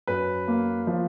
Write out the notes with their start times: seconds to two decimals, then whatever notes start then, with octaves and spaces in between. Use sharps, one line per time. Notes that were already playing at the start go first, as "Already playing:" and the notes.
0.07 F#2 B4
0.48 A#3
0.87 F3